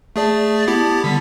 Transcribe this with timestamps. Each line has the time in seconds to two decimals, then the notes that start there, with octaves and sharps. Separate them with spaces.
0.16 A3 G#4 D5 A5
0.67 B3 E4 G4
1.04 D3 G3 B6